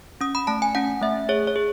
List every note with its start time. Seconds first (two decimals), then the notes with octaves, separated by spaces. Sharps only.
0.21 C#4 D#6
0.35 B5
0.47 A3 A5
0.62 G#5
0.75 C#4 F#5
1.01 A3 E5
1.29 G#4 C#5
1.47 C#5
1.56 G#4